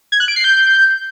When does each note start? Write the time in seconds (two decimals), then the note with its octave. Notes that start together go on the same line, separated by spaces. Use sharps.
0.12 G#6
0.20 F#6
0.28 D7
0.36 C7
0.44 G6